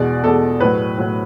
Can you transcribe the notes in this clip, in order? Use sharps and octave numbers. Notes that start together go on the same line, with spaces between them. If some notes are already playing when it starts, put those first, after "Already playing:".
Already playing: E2 B2 G#3 D5
E2 B2 G#3 A4
A2 F#3 B4
A2 F#3